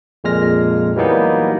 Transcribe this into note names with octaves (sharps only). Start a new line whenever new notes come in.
F2 A#2 G#3 F6 A#6
E3 F#3 G3 A#3 B3 D#4